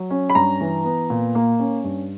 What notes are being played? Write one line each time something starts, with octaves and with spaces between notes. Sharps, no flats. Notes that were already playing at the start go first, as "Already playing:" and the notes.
Already playing: F#3
C#4
B5
G2 A#5
E3
B3
A#2
A#3
C#4
G2